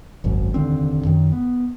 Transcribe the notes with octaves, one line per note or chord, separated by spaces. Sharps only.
D#1 G#1 F#2
F1 D#2 D3 C4
F#2 D#3
B3